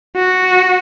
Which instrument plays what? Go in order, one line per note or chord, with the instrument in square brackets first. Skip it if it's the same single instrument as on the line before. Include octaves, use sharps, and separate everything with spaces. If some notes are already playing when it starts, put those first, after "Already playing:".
[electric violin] F#4